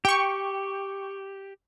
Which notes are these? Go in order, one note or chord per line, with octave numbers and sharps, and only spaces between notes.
G4 G5 C#6